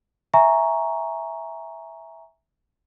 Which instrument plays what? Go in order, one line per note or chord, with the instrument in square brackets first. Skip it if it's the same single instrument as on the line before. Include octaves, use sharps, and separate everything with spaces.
[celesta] E5 G#5 A#5 C#6